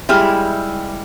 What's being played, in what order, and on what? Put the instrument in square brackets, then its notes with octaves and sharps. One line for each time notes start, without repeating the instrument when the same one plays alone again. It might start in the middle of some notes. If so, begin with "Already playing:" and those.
[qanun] G3 G#3 E4 [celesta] E5 G5 F6